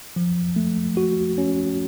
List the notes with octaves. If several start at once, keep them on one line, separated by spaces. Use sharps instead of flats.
F3
A3
F#4
C#4